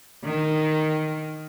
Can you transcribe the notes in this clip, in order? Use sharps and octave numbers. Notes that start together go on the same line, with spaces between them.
D#3